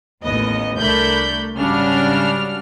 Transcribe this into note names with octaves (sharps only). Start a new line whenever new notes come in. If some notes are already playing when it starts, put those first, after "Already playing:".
A1 D#2 B3 D#5
C2 A3 D4 A#4 B5 G6
G#1 C#3 G3 D4 F#4 F6